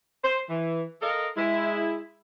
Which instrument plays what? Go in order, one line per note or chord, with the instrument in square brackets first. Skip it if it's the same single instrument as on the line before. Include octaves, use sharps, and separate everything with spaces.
[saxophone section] C5
E3
A4 A#4 D#5 F5
G#3 E4